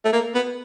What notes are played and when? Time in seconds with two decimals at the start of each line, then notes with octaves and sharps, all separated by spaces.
0.05 A3
0.13 A#3
0.35 B3